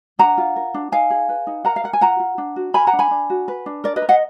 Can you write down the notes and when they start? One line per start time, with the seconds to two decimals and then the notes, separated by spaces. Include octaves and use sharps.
0.19 D4 F#5 A#5
0.38 F4
0.56 A#4
0.74 D4
0.92 D#4 F5 G#5
1.10 G#4
1.29 B4
1.47 D#4
1.65 A#4 F#5 A#5
1.76 F5
1.84 A#4 F#5
1.93 G#5
2.01 F4 F#5 A#5
2.20 F4
2.38 D4
2.56 F#4
2.74 A#4 G#5 B5
2.87 F#5 A#5
2.93 D4
2.99 G#5 B5
3.11 D4
3.30 F#4
3.48 B4
3.66 D4
3.84 A#4 D5
3.96 B4 D#5
4.02 A#4
4.09 D#5 F#5